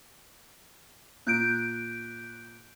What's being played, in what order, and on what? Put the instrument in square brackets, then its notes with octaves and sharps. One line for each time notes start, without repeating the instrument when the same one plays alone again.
[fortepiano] A#2 [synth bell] F#6 G6 D7